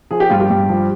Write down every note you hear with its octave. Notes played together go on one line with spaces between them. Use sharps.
F3 G#4
G4
G2 F4
G4
G2
F3